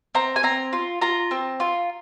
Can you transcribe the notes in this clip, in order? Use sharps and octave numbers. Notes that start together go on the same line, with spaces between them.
C4 A#5
G#5
C4 A#5
F4
F4 A#5
C4
F4